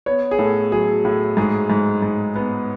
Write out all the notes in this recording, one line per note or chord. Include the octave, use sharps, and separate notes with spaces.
B3 C#5
G#4
A2 A4
F#3 G#4
A2
G#2 G#4
G#2
G#2
B3